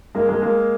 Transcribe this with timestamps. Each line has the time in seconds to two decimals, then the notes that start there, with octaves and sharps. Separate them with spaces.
0.15 G#3 A#3
0.29 G#3 A#3
0.42 G#3 A#3